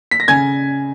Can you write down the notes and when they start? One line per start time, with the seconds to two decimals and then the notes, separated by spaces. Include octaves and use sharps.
0.11 B6
0.20 A#6
0.28 C#3 G#5 G#6